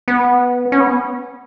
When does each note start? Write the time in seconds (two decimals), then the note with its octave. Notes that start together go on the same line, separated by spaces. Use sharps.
0.08 B3
0.72 C#4
0.80 B3